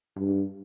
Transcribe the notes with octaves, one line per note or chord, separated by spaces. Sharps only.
G2